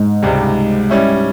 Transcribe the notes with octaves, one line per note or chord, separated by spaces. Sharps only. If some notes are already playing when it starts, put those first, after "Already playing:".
Already playing: G#2
C#2 C3 G3
G3 C#4 E4